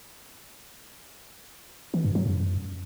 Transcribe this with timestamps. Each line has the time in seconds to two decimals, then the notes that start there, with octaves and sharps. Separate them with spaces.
1.94 E3
2.04 G2
2.15 F#3
2.26 F#2